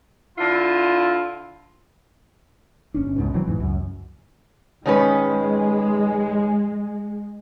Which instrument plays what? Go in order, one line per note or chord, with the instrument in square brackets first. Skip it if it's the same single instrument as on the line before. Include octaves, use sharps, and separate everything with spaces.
[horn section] D3 E4 F4
[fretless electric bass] G1 C#4 D4
C#2 G#2 B2
D#3 E3 F#3 C4
E2 G#2 E3
C#2 F#2
[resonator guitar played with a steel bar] D#3 C#4 B4 [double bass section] G#3